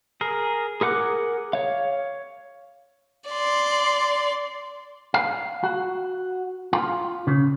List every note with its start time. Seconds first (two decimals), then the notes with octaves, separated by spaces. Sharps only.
0.21 G#4 A#4
0.81 G#4 A#4 F#5 D6 F#6
1.53 C#5 F5
3.30 D5 C6
5.14 F5
5.64 F#4
6.73 F4
7.27 C#3